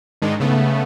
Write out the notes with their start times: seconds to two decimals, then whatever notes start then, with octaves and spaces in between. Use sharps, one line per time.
0.22 G#2 D#3 G#3 D4 D#4
0.40 C#3 A3 B3